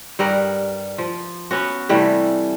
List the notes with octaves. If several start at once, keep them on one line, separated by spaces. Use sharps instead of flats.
G2 G3 A#4 F#5
F3
B3 C#4 F#4
C3 E3 G3 A3